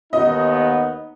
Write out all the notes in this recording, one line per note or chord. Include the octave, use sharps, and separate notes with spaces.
D#2 B3 D#4 D#5